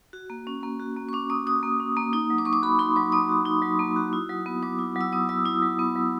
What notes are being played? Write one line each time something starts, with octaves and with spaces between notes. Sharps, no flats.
F#4
A#3
C#4
A#3
F#4
A#3
C#6
C#4 D6
A#3 D#6
F#4 D#6
A#3
C#4
A#3
D#4 D#6
F#3
D6
A#3 C#6
D6
F#4 B5
D#4 C6
F#3 D6
A#3 D#6
F#4
D#4
F#3
A#3
F#4
E4
F#3
B3
F#3 D6
E4
F#3
E6
B3 D#6
F#3 E6
E4 D#6
F#3
B3
F#3